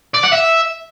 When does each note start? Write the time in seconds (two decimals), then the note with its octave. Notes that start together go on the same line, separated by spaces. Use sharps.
0.15 D5
0.24 F#5
0.33 E5